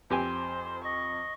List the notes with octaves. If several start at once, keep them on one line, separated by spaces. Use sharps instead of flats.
F2 C4 G4 C5 G#5
D#5 C#6